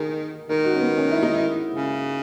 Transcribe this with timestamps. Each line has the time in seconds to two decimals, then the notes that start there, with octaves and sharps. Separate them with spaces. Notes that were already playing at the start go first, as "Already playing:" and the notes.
Already playing: D#3 G#4 A#4
0.49 D#3 A#4
0.64 F#4
0.73 C#4
0.80 B3
0.97 C#4
1.11 E4
1.23 D#4
1.34 E4
1.74 C#3